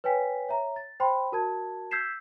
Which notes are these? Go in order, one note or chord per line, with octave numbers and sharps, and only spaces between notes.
B4 C#5 G5 G#5 B6
C#5 E5 A#5
A6
C5 G5 B5 C6
F#4 A#4 A5 G#6
E6 G6 G#6 B6 C7 E7